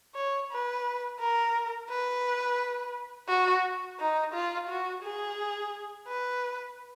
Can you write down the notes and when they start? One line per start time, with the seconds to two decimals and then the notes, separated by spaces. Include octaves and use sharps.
0.15 C#5
0.51 B4
1.20 A#4
1.89 B4
3.28 F#4
3.99 D#4
4.33 F4
4.69 F#4
5.03 G#4
6.08 B4